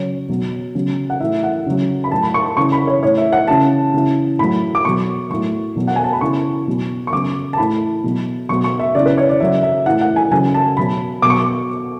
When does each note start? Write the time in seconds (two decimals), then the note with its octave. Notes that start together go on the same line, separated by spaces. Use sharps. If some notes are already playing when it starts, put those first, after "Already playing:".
Already playing: C#3 F#3 C#5
0.29 B2 F#3
0.75 C#3 F#3
1.10 F#5
1.20 A2 E3 E5
1.43 F#5
1.66 C#3 F#3
2.04 B5
2.11 A2 F#3 A5
2.23 B5
2.34 C#6
2.57 C#3 E3 C#6
2.72 B5
2.87 C#5
3.02 A2 E3 C#5
3.18 E5
3.33 F#5
3.48 C#3 E3 A5
3.93 C#3 E3
4.39 A2 F#3 B5
4.75 D6
4.85 B2 F#3 C#6
5.30 A2 F#3 C#6
5.76 B2 F#3
5.87 F#5
5.96 G#5
6.04 A5
6.13 B5
6.21 C#3 E3 C#6
6.67 B2 F#3
7.07 C#6
7.13 C#3 F#3 D6
7.53 A5
7.58 A2 E3 B5
8.03 B2 F#3
8.49 B2 F#3 C#6
8.64 C#6
8.79 E5
8.95 C#3 E3 D5
9.06 B4
9.18 C#5
9.29 D5
9.40 C#3 F#3 E5
9.63 E5
9.86 A2 E3 F#5
10.01 F#5
10.16 G#5
10.32 C#3 F#3 G#5
10.54 A5
10.77 B2 F#3 B5
11.22 B2 F#3 D6
11.30 C#6
11.37 D6